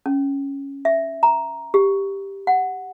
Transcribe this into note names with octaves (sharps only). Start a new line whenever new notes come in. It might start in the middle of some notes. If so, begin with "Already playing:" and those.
C#4
E5
A#5
G4
F#5